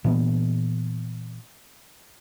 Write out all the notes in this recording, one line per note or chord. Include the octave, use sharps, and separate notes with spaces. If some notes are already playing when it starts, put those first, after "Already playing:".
A#2 E3 B3